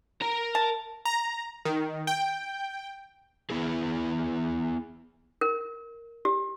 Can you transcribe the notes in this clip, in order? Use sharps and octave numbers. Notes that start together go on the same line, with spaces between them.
A#4 A#5
A5
A#5
D#3
G5
B3 E4 G#4
A#4
G4